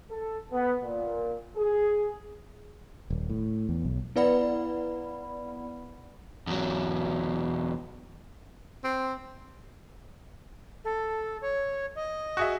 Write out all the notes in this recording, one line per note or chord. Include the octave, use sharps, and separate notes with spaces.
A4
B3
A#2
G#4
D#1
A2
E2
B1
B3 E4 B4 D5 F#5 B5
E2 F#3
C4
A4
C#5
D#5
F#4 G#4 E5